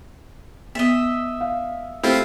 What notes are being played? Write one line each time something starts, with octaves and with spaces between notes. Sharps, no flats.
B3 D#5 E5
F5
A3 C4 E4 F4 G4